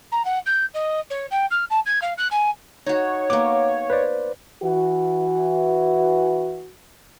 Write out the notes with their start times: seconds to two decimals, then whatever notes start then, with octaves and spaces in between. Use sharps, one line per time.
0.12 A#5
0.25 F#5
0.46 G6
0.74 D#5
1.10 C#5
1.31 G5
1.51 F6
1.70 A5
1.86 G#6
2.02 F5
2.18 F#6
2.31 G#5
2.86 D#4 F#4 C#5
3.30 A#3 B3 D6
3.90 B4 C5 D5
4.63 E3 F#4